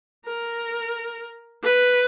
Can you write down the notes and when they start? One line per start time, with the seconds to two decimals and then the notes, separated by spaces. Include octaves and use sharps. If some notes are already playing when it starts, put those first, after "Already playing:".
0.26 A#4
1.63 B4